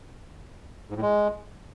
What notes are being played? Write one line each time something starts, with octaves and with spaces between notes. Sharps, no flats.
G#2
A2
G#3